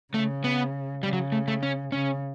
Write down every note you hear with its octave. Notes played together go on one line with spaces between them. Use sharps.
C#3 A3
B3
C#3 G3
F#3
A3
A3
C#4
C#3 C#4